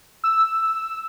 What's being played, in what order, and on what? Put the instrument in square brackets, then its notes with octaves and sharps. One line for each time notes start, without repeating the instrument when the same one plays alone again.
[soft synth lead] E6